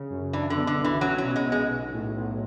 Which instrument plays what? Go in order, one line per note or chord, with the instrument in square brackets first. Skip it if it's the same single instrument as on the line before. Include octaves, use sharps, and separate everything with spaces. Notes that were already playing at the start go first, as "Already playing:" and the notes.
Already playing: [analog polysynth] C#3
F#2
[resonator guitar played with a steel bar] E3 [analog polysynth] D4
[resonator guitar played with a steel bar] D3
[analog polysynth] B2
[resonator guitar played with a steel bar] D3
[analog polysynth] B1
[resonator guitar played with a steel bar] E3
[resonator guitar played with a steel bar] F#3 [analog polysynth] C#4
[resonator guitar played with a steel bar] F#3
[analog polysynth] B2
[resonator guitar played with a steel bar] G#3
[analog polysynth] B1
[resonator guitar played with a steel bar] G#3
[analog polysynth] B1
A2
B1